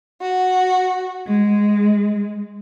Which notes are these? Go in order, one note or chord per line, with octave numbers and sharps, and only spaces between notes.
F#4
G#3